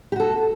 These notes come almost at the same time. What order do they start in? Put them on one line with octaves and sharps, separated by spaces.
G4 F#4 A4